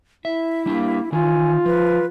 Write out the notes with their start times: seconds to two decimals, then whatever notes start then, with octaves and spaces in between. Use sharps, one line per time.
0.25 E4 E5
0.66 G3 A#3 D4 G4
1.12 D#3 E3 D#4 F4 G#5
1.66 F3 B4